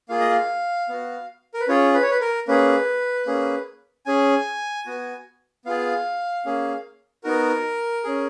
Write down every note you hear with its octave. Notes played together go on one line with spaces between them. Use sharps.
A#3 F4 G#4 F5
D#5
F5
B3 F#4
A#4
B4
C#4 F4 G#4 C#5
B4
C#5
B4
A#4
A#3 C#4 G#4 B4
A#3 C#4 G#4
C#4 G#4 G#5
B3 F#4
B3 F4 G#4 F5
A#3 C#4 G#4
B3 D#4 F#4 A#4
C#4 G#4